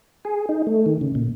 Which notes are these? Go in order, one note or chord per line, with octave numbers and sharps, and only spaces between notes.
G#4
D#4
A3
D#3
C#3
A#2